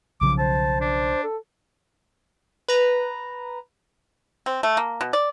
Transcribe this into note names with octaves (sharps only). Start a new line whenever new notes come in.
B1 C#3 F3 D6
C5 A5
D4
A4
B4 A#5
C4
A3
A#3
B2
D5